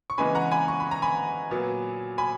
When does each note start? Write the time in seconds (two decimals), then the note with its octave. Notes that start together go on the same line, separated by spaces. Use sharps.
0.10 C#6
0.18 C#3 E3 G#3 B3 G#5 B5
0.35 F#5 A#5
0.51 G#5 B5
0.68 C#6
0.80 B5
0.91 A#5
1.02 G#5 B5
1.51 A#2 F#3 B3
2.18 G#5 B5